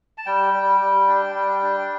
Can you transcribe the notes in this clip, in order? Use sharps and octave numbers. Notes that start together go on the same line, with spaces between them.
A5
G3 G5
G3
G3
D4
G3 G5
D4